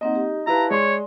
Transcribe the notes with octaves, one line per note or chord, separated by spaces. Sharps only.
A#3 C4 D#4 D#5 F#5
G4
E4 G4 B4 F5 A5 A#5
G#3 C#5 D5 C6